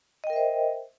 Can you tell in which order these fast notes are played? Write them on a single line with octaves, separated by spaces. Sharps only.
D#5 G5 A#4 E5 C5